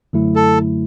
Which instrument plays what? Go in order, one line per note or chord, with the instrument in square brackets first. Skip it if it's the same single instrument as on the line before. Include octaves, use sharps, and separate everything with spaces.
[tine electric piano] F#2 D3 F#3 A3 E4
[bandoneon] A4